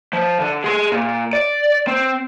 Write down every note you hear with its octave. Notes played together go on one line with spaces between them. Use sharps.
F3
D3
G#4 C6
A#2
D5
C4